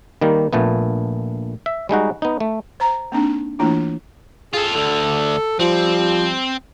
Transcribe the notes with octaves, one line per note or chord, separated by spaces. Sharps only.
D#3 G3 A#3
A#1 A#2 A3 B3
E5
G3 G#3 D#4 F#4
B3 D#4
A3
C5 A#5
A#3 C4 D4 D#4
E3 A3 A#3 D4 E4 F4
F4 G#4 A4
D2 D3 A4
F3 G3 C4